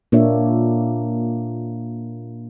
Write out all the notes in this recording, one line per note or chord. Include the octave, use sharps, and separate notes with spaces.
A#2 A#3 D4 C#5 E5